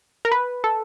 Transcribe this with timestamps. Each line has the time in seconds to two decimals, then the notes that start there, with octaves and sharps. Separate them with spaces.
0.25 A#4
0.32 B4
0.64 A4